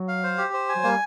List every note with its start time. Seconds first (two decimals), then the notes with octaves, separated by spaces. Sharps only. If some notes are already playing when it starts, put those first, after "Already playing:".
Already playing: F#3
0.08 F5
0.24 C5
0.38 G4
0.54 C5
0.69 G#5
0.76 F#3
0.84 G3 A#3